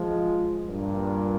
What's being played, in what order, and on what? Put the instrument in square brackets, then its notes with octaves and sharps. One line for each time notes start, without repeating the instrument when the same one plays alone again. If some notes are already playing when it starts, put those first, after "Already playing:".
Already playing: [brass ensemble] F3 G#3
G2 A#2